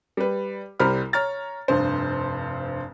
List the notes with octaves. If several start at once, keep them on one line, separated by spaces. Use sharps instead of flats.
G3 B4
C2 G3 C5 A#5 B5 F6
C#5 A#5 F6 A6
F1 G2 C5